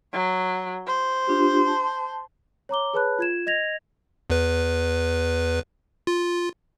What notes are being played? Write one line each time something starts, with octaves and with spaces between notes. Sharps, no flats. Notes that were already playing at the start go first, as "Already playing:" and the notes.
F#3
C5
D4 F4 G4
A5
C#5 A#5 D6 G7
G#4 B4 C#5 A5 B5 F#6
F4 G#6 E7
D#5 G#6 A#6 F7
E2 B4
F4